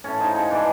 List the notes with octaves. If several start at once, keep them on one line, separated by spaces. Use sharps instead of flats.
A2 C#4
F3 G#3 D#4
G#2 D#4
E3 G#3 D4